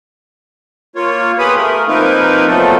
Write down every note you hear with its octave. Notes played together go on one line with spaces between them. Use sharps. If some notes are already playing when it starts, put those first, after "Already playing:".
A#3 F4 C#5
B3 G4 G#4 B4 B5 D#6
A3 A#4
F3 A#3 C4 D#4 A#4 B4
A#2 F3 F#3 A3 B3 A4